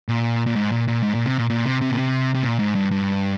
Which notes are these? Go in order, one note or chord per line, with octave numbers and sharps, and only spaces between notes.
A#2
A#2
G#2
A#2
A#2
G#2
A#2
C3
A#2
A#2
C3
C3
A#2
C3
C3
A#2
G#2
G2
G2